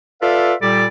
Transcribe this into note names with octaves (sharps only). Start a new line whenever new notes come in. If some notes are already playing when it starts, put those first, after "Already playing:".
F4 A4 B4 D5 E5 F5
A#2 G3 G4 A4 D5